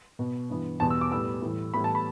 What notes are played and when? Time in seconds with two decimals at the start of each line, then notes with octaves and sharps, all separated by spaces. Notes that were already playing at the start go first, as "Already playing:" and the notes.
0.19 B2 B3
0.50 G2 E3 B3
0.80 E2 B2 G3 B3 A5
0.90 E6
1.01 D6
1.11 A2 G3 B3 E6
1.42 A2 E3 G3
1.74 A2 E3 G3 B3 B5
1.84 A5
1.95 B5